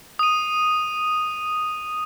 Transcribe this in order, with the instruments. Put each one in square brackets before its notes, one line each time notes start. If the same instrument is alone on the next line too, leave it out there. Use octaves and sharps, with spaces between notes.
[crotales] D#6 D#7